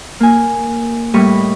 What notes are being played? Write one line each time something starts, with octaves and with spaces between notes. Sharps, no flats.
A#3 G#5
A2 G3 A#3 D#5 B5 C#6